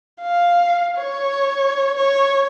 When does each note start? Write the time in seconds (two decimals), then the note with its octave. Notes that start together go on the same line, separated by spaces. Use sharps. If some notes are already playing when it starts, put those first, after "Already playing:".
0.21 F5
0.97 C#5
1.97 C#5